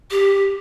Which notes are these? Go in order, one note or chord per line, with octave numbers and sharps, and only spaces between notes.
G4